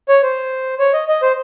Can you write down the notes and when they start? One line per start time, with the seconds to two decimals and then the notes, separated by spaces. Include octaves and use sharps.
0.09 C#5
0.23 C5
0.79 C#5
0.94 D#5
1.08 D#5
1.22 C5